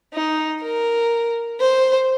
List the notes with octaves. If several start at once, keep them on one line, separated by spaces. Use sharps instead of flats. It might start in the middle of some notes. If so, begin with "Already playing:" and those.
D#4
A#4
C5